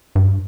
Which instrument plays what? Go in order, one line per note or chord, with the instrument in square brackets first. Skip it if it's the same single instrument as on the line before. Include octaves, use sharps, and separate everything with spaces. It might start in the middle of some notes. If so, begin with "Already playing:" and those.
[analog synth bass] G2